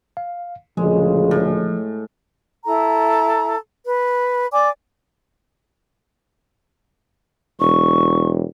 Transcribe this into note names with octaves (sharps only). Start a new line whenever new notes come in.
F5
D2 A#2 C#3 F3 G#3
A2
E4 A4 A#5
B4
D5 G#5 D6
E1 C#6